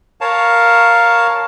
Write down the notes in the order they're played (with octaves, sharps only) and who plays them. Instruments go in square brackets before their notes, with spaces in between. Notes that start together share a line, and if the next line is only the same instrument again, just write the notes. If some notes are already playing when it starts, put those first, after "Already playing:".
[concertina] A#4 C#5 F5 A5